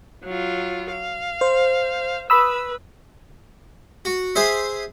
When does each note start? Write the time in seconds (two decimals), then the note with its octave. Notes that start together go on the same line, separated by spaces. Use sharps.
0.24 F#3 F4
0.92 F5
1.41 C5
2.30 B4 B5 D#6 E6
4.05 F#4
4.35 G#4 C5 E5